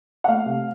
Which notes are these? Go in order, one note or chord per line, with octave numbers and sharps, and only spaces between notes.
F#5
A3 F5
C3